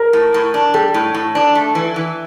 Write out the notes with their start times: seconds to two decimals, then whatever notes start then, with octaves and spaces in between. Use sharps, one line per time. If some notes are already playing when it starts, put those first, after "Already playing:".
Already playing: A#4
0.13 A2
0.34 A2
0.54 D4
0.74 G3 A4
0.94 A2
1.14 A2
1.35 D4
1.55 A3
1.75 E3
1.96 E3